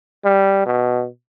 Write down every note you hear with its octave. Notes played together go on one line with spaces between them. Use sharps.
G3
B2